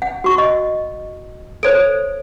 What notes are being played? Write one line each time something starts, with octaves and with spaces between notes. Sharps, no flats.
F#5
F#4 C#6
D#5
A4 C5 C#5 D7